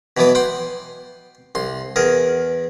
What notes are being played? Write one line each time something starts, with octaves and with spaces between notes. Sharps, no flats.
B2 E3 F#3 B3 D6
F#5 G5 C6
C2 C6
E2 G#4 A#4